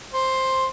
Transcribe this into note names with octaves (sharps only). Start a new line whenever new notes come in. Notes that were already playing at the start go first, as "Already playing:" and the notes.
C5